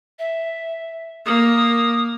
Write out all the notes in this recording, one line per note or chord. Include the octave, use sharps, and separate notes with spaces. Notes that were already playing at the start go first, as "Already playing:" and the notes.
E5
A#3 D#6